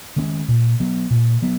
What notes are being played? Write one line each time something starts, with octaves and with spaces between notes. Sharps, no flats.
D#3 G#3 C#4
A#2
F#3 B3
A#2
F#3 B3